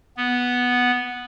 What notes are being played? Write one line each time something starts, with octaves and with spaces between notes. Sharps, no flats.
B3